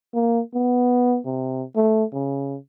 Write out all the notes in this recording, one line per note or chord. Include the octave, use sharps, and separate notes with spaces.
A#3
B3
C3
A3
C#3